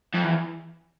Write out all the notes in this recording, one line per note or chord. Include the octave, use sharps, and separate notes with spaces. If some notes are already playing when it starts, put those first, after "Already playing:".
F2
E2